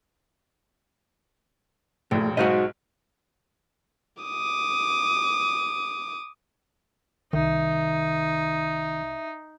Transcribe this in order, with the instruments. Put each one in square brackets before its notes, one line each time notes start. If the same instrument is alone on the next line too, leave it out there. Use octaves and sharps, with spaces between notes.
[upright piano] E1 A#1 [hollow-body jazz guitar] A2
[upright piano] B1 G#2 [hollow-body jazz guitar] F#4 C5 D#5
[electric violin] D6 D#6
[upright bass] C2 [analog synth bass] D#3 [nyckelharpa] D#4 [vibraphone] E5